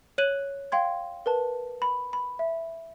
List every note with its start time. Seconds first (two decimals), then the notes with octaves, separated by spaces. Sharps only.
0.18 C#5 F#6 D#7 F#7
0.72 F5 G5 C6 G#6
1.26 A#4 B4 A5
1.82 B5
2.13 B5
2.39 E5